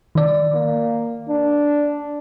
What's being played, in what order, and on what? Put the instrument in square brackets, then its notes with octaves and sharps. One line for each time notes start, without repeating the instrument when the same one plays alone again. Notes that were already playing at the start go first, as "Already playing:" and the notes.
[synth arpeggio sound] D#3 D5
[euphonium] A#3
D4